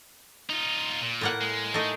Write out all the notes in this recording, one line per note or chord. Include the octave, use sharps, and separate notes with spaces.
D#4 F4
A#2
A2 A#3 F#5
G#3
A3 D#4